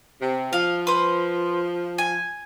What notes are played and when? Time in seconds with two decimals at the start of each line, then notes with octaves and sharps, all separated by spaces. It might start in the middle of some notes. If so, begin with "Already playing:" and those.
0.20 C3
0.53 F3 F5
0.87 B4 C5
1.98 G#5